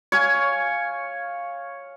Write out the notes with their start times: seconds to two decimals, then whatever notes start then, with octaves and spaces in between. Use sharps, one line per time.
0.12 C#5 F5 G#5